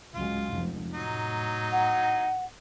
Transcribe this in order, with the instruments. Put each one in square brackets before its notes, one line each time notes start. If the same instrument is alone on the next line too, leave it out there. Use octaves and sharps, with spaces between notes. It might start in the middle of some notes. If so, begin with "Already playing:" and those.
[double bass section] C#2 F#3 G#3 [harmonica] F4
[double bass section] F1 F3
[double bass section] A2 [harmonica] F#3 D#4
[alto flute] F#5